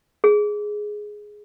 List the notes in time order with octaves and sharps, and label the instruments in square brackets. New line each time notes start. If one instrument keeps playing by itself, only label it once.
[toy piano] G#4